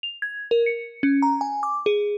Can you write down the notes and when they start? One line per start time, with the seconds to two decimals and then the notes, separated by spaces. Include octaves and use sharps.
0.03 F7
0.22 G#6
0.51 A#4
0.66 C#7
1.03 C#4
1.22 A#5
1.41 G#5
1.63 D6
1.86 G#4